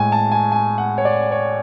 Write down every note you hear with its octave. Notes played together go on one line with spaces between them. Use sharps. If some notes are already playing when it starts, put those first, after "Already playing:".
Already playing: A2 G#3 G#5
A5
G#5
G#5
F#5
C#5
D5
C#5